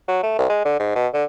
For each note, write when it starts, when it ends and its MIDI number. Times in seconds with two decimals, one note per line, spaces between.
0.08 0.18 54
0.23 0.36 57
0.38 0.46 36
0.50 0.61 56
0.65 0.77 50
0.79 0.92 44
0.95 1.07 47
1.14 1.24 50